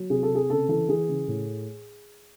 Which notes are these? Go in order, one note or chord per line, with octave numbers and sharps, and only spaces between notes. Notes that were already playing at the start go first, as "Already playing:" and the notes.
Already playing: F#3
C3 G#4
A4
C3
G#4
C#3 A4
E3 A4
E3 G#4
C#3
A2